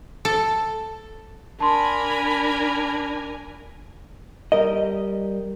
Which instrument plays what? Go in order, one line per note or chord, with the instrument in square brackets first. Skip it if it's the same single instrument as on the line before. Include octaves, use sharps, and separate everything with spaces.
[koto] A4
[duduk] D4 [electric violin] A#4 G#5 [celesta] A5 C6 [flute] B5
[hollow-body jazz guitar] G3 A#4 D#5